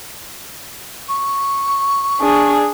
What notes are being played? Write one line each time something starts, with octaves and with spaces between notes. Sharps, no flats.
C#6
D4 G#4